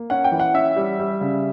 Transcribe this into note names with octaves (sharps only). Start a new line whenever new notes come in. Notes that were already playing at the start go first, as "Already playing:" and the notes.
Already playing: A#3
C#4 F#5
G5
E3
F#5
C#4 E5
G3
G3
C#3